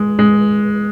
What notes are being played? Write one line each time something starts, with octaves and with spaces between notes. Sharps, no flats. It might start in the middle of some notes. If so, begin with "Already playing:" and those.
Already playing: G#3
G#3